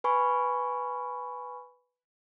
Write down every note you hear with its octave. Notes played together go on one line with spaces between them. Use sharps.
B4 G#5 B5 C#6